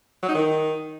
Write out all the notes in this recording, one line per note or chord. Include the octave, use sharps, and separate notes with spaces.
F#3
D#4
D#3